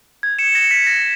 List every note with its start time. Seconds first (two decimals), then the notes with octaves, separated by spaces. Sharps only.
0.23 G#6
0.39 C#7 E7
0.55 A#6 C#7
0.71 B6
0.87 A#6